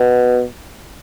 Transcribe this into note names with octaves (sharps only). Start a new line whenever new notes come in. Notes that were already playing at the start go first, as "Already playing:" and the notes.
Already playing: B2